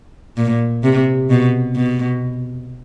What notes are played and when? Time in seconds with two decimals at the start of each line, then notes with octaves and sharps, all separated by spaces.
0.37 A#2
0.84 C3
1.30 B2
1.76 B2